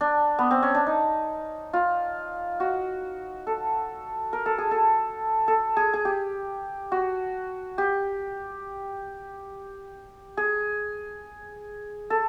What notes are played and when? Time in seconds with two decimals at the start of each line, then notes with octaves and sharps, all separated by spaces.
0.01 D4
0.39 B3
0.51 C4
0.63 C#4
0.75 D4
0.87 D#4
1.73 F4
2.60 F#4
3.47 A4
4.33 A#4
4.46 A4
4.58 G#4
4.71 A4
5.48 A4
5.77 G#4
5.94 G#4
6.05 G4
6.92 F#4
7.78 G4
10.37 G#4
12.10 A4